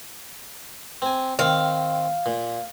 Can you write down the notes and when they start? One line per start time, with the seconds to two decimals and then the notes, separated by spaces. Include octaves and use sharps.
1.02 C4 G#5
1.39 D#3 C4 F5
2.26 A#2